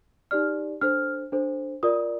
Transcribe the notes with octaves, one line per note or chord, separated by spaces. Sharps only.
D#4 G4 D5 F6
D4 A4 C5 F6
D4 A4 C5
F4 A#4 D5 D#6